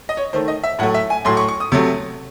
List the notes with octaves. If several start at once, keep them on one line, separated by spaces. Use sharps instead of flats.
D#5
C#5
D#3 A3 C5
D#5
E5
A2 F#3 A3 F#5
E5
G#5
A2 F#3 A3 C6
C#6
C#6
D#6
C3 F#3 A3